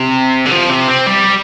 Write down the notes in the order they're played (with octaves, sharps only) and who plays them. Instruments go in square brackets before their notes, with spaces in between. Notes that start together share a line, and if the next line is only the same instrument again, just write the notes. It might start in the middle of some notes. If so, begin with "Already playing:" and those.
Already playing: [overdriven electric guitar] C3
D3
F3
C3
C4
G3